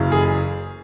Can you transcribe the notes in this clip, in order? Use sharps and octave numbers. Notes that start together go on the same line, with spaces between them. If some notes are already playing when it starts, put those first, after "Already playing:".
Already playing: F#1 F#2 C#3 E3
G#4